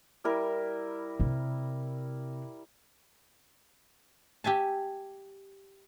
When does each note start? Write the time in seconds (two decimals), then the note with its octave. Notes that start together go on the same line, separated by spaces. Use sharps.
0.24 G3 E4 A#4
1.20 C3
4.44 G4 E5 G#5 A5